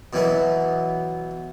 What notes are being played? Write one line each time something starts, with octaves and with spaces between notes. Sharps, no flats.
B2 E3 F#3 B3